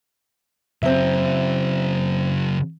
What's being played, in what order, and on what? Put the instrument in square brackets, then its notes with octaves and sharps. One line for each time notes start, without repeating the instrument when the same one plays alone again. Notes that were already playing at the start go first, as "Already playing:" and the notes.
[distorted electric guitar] C#3 F#3 [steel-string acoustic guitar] C4 E5